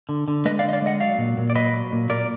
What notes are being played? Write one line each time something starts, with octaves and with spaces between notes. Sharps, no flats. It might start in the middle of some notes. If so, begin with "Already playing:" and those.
D3
D3
G#3 B4 D#5
D5 F5
D3
D#5
D5 F5
G#3 D#5 F#5
F#3 D5 F5
A#2
A#2
D5
F#3 B4 D#5
F#3
A#2
A#2 A#4 D5